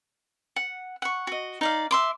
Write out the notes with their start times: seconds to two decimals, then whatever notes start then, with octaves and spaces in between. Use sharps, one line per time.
0.56 F#5
1.02 F#5 C#6
1.27 F#4 D#5
1.61 D#4 D5 F5
1.91 E5 C6 D6